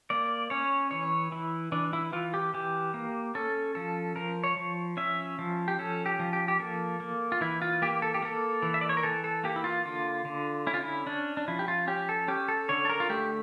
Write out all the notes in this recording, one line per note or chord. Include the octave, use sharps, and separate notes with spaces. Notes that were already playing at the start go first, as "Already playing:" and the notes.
A#3 D5
C#4 C#5
E3 C#5
E3 E4
E3 D4
E4
E3 F4
G4
E3 G4
A#3
C#4 A4
F3 A4
F3 A#4
C#5
F3
C#4 E5
F3
G4
C#4 A4
G4
F3
G4
G4
A#3 A4
A#3
F4
E3 E4
F4
A#3 G4
A4
G4
A#3 A4
E3
E5
D5
C#5
A#4
E3 A4
A4
A#3 G4
E4
F4
D3 F4
D3
C#4 E4
F4
E4
C#4 D4
D4
F3 E4
G4
F4
C#4 G4
A4
C#4 G4
A4
D3 C#5
A4
A#4
F4
A3 G4